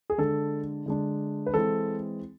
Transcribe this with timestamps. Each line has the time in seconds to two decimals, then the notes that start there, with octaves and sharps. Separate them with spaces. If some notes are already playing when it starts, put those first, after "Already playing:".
0.10 G#4
0.18 D3 G#3 D4 A4
0.86 D3 G#3 D4
1.46 B4
1.54 E3 G#3 C4 A4